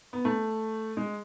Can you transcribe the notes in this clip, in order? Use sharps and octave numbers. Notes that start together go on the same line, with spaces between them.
B3
A3
G#3